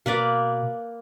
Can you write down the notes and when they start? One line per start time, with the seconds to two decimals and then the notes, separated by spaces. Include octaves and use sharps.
0.06 B2 A#3 B4 D5